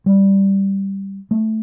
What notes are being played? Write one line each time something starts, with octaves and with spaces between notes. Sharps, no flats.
G3
A3